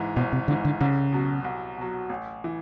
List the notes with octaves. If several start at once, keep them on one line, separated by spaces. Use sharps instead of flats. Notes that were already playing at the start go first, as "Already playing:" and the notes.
Already playing: G#1 G#2 E3
G#1 B2
C3
G#2 D3 E3
D3
C2 C#3
B2 F#3
C2
B2 F#3
A1
E3